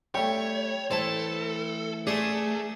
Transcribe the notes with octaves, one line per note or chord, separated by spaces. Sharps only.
G3 A3 C#5 G5
E3 A3 A4 C5 A5
A3 G#4 D5 C6